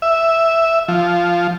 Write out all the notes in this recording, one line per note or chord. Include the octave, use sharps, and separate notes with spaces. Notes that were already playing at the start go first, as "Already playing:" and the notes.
E5
F3